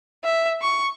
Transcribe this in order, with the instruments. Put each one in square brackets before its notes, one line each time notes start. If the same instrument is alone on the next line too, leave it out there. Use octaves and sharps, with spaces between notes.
[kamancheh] E5
C#6